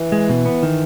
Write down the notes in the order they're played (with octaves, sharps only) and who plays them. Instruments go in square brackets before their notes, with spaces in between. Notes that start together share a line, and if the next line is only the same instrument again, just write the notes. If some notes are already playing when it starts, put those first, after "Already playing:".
Already playing: [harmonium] E3
[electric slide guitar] G#3
B2
B3
D#3